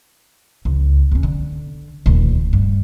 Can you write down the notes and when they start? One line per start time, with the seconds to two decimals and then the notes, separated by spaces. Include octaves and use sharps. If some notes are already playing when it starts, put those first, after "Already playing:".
0.65 C#2
1.12 E2 C#4
1.23 D3
2.06 D#1 D2
2.53 G2